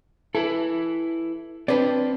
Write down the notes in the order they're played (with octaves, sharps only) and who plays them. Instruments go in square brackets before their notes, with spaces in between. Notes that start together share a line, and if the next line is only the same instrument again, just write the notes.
[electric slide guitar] E4 B4 [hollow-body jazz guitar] A4
[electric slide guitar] C4 A5 [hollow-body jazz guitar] D4 B4 D5